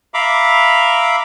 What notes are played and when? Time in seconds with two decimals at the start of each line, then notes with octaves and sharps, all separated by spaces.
0.14 E5 F5 A#5 B5 D6